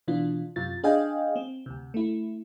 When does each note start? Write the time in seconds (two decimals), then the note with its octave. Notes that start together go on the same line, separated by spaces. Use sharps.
0.08 B2 E3 D4 F4
0.56 F#2 C3 F4 A6
0.83 D4 G#4 D#5 F5 G5 G#5
1.36 C4
1.66 D2 C3
1.94 A3 E4